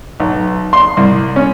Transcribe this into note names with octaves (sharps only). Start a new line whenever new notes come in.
B1
C6
C2
C#4